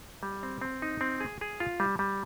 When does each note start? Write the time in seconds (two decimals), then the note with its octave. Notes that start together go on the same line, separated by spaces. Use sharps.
0.23 G3
0.43 C4
0.61 C4
0.82 D#4
1.01 C4
1.20 G#4
1.41 G#4
1.60 F4
1.80 G3
1.99 G3